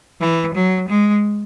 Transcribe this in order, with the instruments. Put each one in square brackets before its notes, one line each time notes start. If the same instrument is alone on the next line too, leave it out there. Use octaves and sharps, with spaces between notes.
[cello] E3
F#3
G#3